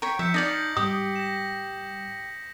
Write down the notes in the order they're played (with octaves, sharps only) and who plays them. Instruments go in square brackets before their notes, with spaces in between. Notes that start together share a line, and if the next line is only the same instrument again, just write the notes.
[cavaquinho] C#5 G5 [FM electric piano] A#5 C#6 B6
[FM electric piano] F3 [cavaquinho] E5 [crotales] G6 B6 C#7
[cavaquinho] D#4 D5 F5 [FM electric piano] A5 G6 G#6 [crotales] A#6 F#7
[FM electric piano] G#2 G3 [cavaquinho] G4 [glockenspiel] D#6
[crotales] A#6 E7